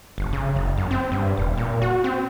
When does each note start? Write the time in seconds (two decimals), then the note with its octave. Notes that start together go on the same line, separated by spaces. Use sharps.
0.18 G1
0.33 C#3
0.56 F#1
0.78 F#2
0.91 C4
1.12 G2
1.37 E1
1.57 A#2
1.82 F#4
2.04 C4